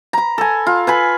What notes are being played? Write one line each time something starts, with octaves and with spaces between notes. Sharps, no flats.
A#5 B5
A4 G#5
F4
B4 G#5 B5